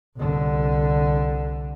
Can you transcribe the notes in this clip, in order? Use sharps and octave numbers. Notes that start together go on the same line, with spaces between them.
C2 D3